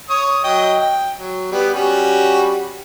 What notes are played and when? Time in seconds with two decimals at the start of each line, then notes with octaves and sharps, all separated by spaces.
0.09 C#5 D#6
0.44 F#3 D#5 G5
0.79 G5
1.18 F#3
1.52 G3 B3
1.74 G3 C#4 F#4